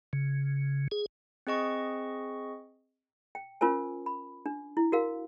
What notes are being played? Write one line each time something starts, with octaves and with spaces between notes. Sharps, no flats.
C#3
G#4
C4 G#4 D#5 C#6
G5
C#4 F4 A#4 C5 G#5
B5
D4
E4
F#4 A#4 F5